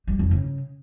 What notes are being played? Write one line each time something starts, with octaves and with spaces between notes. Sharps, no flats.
G3
F2
C#3